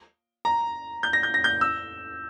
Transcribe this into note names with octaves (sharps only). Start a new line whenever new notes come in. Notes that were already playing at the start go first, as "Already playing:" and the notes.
A#5
G6
A#6
G6
A#6
G6
E6